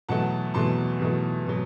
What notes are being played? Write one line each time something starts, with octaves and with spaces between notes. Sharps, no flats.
E2 B2 F#3 A3 F#5 A5
E2 B2 F#3 A3 A5 C6
E2 B2 F#3 A3
B2 F#3